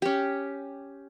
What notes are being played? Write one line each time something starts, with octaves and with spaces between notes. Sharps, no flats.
C#4 G4